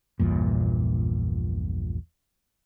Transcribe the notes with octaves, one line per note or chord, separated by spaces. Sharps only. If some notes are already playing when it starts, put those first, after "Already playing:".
A#1 E2 G2 A#2